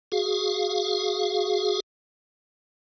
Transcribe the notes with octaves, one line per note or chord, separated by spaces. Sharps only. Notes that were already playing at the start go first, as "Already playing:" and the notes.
F#4 G#4 F5